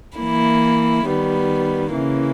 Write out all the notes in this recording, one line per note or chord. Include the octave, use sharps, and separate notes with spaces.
E3 A#3 E4
D#3 G3 B3
C#3 E3 A#3